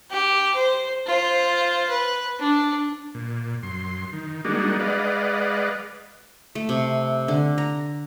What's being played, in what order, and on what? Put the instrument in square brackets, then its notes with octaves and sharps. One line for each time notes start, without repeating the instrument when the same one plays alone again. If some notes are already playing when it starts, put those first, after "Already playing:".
[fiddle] G4
C5
F4 C5
B4
D4
[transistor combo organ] A#2
F#2 C6
D#3
G3 G#3 A#3 D4 D#4 F#4
G#3 B4 D5 D#5 F5 F#5
[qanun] A3
C3
D3
A#5